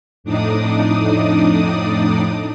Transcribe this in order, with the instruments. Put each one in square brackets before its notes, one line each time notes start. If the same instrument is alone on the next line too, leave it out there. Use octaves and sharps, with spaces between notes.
[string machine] F2 A2 D4 D#4 D5 D#6